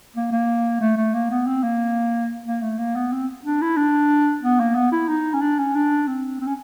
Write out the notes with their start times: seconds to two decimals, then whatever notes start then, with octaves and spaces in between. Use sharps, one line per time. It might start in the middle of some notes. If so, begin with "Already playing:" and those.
0.16 A#3
0.31 A#3
0.81 A3
0.97 A3
1.14 A#3
1.31 B3
1.47 C4
1.63 A#3
2.46 A#3
2.62 A3
2.79 A#3
2.95 B3
3.12 C4
3.45 D4
3.61 E4
3.77 D4
4.43 B3
4.60 A#3
4.75 B3
4.92 E4
5.08 D#4
5.33 C#4
5.41 D4
5.59 C#4
5.75 D4
6.07 C4
6.40 C4
6.47 C#4